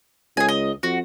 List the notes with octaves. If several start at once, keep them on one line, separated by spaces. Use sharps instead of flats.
C#2 G#4 G#5
D#5
F2 F#4